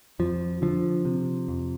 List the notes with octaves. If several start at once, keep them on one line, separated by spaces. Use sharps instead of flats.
F2 F3
D3 F3
C3
F2